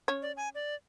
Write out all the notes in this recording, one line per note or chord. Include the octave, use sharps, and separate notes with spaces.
C#4 C#5
D5
G#5
D5